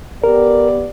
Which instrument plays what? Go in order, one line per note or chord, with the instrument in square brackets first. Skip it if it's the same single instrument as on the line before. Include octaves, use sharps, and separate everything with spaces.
[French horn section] B3 G4 D5 [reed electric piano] A#4